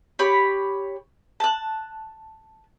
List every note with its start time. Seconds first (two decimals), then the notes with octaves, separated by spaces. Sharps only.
0.19 G4 C#5 B5
1.40 A5 F#6